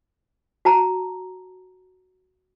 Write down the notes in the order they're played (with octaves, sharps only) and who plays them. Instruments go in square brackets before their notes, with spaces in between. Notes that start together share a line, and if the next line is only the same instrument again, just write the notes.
[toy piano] F#4 A5 A#5